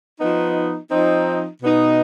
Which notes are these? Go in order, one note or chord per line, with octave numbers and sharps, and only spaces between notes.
F3 B3 D#4
F3 C4 D#4
B2 B3 D#4